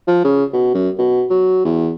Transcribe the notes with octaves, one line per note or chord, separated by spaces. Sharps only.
F3
C#3
B2
F#2
B2
F#3
E2